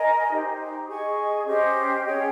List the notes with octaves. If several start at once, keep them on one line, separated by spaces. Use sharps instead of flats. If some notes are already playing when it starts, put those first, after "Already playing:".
Already playing: A#4 D#5 G#5
D#4 G4 C5
G#4 D#5 G#5 C#6
C#4 G4 C5 D#5
C#4 G#4 C#5 G5